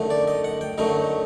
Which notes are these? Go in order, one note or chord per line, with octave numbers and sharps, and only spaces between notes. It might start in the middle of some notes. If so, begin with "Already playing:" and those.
Already playing: F#2 D3 A3 D#4
D5
D#5
F#5
G5
F#2 D3 F#3 A3 D#4 D#5